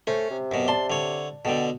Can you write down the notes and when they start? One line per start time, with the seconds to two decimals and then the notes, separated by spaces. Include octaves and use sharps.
0.07 A3 C#4 C5
0.30 C3
0.51 F#2 B2
0.68 D5 A5 C6
0.90 D3 C#5
1.45 B2 D3 A4 G5